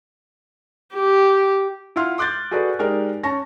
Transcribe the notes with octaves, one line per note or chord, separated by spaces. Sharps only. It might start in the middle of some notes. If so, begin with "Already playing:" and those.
G4
E4 F4 F#5 C6 F6
C6 D6 F#6 G6 A6
F#4 G#4 A4 B4 D5
G#3 D#4 G4 A#4 D5
C#4 A5 C#6 A#6